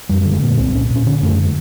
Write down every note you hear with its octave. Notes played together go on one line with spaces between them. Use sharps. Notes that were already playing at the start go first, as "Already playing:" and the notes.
F#2 G3
G3
D3
G#3
A#2 A#3
C2 C4
A#2 C#4
A#2
C#4
D3 C#4
F#2 A3
D3 G#3